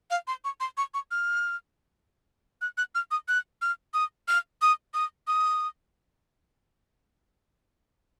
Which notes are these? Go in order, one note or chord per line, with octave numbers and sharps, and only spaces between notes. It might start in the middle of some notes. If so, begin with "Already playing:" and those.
F5
C6
C#6
C6
C#6
C#6
F6
F#6
F#6
F6
D#6
F#6
F6
D#6
F6
D#6
D#6
D#6